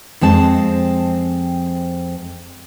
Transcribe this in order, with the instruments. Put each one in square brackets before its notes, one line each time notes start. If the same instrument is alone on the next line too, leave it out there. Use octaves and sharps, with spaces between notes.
[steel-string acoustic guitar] F2 G#3 C4 A5